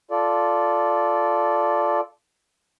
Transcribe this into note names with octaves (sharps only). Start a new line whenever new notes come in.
F4 A4 D5